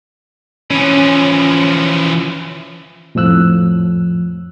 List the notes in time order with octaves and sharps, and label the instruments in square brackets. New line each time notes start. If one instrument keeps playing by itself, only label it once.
[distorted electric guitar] E3 F3 [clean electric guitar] C#4
[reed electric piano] F2 A2 F3 E6 F#6